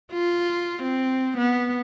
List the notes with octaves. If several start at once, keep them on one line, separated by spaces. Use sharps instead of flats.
F4
C4
B3